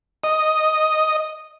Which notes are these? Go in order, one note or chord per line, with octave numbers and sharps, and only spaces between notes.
D#5